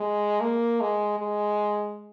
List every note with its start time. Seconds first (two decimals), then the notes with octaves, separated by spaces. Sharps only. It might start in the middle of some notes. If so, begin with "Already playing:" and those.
Already playing: G#3
0.41 A#3
0.80 G#3
1.20 G#3